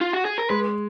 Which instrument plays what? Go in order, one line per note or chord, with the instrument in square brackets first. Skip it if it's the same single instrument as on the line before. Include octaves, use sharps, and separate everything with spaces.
[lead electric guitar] F4
F#4
G#4
A#4
[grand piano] G#3 [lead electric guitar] B4